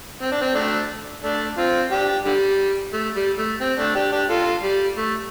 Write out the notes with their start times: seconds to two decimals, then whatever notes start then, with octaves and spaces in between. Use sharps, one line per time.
0.22 C4
0.32 D4
0.42 C4
0.55 A3 D4
1.23 A3 D4
1.58 C4 F4
1.91 D4 G4
2.26 D3 G3
2.93 A3
3.16 G3
3.38 A3
3.61 C4
3.78 A3 D4
3.95 D4 G4
4.12 D4 G4
4.30 F4 A4
4.63 G3
4.97 A3